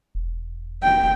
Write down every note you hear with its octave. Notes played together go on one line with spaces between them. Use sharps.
E1
G5